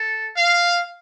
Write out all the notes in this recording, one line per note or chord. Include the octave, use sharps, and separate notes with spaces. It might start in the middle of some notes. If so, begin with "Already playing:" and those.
Already playing: A4
F5